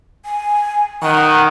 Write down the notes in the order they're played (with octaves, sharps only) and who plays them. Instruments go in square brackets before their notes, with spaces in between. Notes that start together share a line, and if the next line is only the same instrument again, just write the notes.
[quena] G#5
[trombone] D#3 [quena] F#5